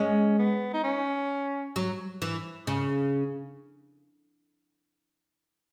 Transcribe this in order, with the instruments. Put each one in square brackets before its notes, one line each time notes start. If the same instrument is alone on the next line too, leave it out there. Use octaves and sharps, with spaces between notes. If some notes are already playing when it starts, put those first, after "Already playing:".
Already playing: [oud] G#3 [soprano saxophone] C#4
[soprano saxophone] B3
D#4
C#4
[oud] F#3
E3
C#3